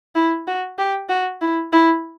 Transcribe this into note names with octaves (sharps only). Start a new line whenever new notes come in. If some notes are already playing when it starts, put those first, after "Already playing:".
E4
F#4
G4
F#4
E4
E4